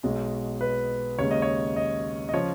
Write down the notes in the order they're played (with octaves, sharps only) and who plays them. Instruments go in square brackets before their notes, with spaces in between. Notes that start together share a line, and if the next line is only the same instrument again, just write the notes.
[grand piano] B1 B2 G#3
B4
D#2 C#3 G#3 C#5
D#5
C#5
D#5
D#5
C#3 F3 C#5